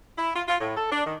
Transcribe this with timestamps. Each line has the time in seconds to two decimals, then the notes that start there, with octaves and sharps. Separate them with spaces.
0.18 E4
0.36 F4
0.48 F4
0.61 A2
0.77 A4
0.91 D4
1.06 D#3